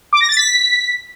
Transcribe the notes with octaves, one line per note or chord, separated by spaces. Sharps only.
D6
A#6
A6
B6